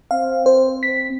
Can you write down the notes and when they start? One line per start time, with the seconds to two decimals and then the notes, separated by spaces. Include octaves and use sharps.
0.11 C4 F5
0.46 C5
0.83 B6